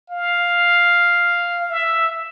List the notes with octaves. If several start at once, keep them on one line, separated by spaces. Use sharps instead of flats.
F5
E5